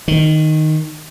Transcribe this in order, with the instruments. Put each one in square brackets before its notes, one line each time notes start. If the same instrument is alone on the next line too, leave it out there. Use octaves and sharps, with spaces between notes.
[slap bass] D#3